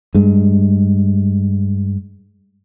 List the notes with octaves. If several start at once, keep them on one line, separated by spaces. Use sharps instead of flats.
G2 G#3